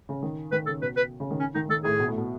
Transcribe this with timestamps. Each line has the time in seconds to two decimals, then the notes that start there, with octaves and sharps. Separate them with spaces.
0.09 C#3
0.23 D#3
0.52 D#3 B4
0.66 C#3 A4
0.82 B2 B4
0.96 B4
1.20 C#3
1.31 D#3
1.40 C#4
1.54 D#3 D#4
1.69 D#3 A4
1.84 A2 G#4
1.99 B2
2.08 A2
2.18 B2